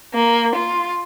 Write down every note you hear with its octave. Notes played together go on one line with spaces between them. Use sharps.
A#3
F4